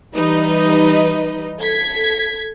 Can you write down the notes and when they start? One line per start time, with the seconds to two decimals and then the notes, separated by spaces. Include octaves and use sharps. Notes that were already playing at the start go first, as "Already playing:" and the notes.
0.14 E3 G3 D#4 B4 D#5
1.60 A4 G#6 B6